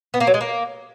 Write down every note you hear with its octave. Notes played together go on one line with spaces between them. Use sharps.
B3
A#3
F#3
G#3
A#3